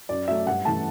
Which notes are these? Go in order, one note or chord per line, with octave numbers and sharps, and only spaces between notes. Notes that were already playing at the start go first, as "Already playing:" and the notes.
F#2 D5
F#3 A3 E5
G2 F#5
E3 A3 A5